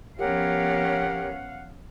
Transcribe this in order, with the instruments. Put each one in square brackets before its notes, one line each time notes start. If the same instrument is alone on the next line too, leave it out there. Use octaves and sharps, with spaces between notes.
[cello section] F3 B3 C#4 [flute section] G4 A#4 C#5 [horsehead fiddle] F5 F#5